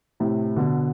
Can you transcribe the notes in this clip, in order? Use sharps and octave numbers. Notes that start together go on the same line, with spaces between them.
A2 C3
B2 D3